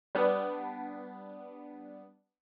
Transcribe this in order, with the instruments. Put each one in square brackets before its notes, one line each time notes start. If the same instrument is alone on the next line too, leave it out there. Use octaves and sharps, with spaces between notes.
[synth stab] G3 B3 D4